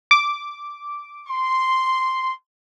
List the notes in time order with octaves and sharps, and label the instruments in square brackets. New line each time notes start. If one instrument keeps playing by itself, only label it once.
[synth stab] D6
[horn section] C6